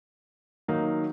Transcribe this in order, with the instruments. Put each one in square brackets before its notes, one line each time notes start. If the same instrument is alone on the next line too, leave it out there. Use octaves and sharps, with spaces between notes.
[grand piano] D#3 F#3 A#3 D#4